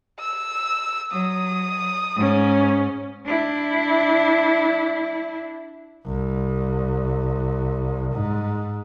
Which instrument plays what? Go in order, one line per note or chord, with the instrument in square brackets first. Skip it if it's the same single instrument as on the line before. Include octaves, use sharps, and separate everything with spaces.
[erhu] E6
[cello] F#3 [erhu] D#6
[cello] G#2 C#4
D4 E4
[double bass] C2
G#2